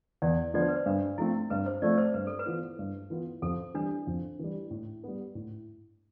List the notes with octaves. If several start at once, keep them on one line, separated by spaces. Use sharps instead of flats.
E2 D5
D3 F3 B3 F4 D5
C5
B4
C5
G2 D4
F3 A3 C4 E4
G2 B4
C5
F3 A3 C4 D5
C5
G2 B4
A4
B4
E3 B3 F4
G2
E3 B3 F4
F2 A4
E3 G3 D4
F2
E3 G3
A2
G3 B3
A2